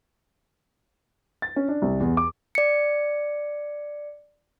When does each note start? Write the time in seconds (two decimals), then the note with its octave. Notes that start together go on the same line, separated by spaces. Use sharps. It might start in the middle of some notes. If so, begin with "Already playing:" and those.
1.42 A6
1.56 C#4
1.68 D4
1.82 C2
2.00 E2
2.17 D6
2.55 D5 C#7